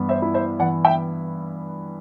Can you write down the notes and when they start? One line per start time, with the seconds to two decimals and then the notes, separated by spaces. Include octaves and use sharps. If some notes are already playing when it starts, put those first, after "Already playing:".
Already playing: G2 E3 B3
0.09 C5 E5
0.22 E4
0.34 C5 E5
0.59 E3 D5 F#5
0.85 E5 G5